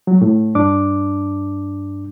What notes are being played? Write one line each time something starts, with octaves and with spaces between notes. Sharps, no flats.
F#3
A2
G2 D4 D6